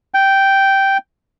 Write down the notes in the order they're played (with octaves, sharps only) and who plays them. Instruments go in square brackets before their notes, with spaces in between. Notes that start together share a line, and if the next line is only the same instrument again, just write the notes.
[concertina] G5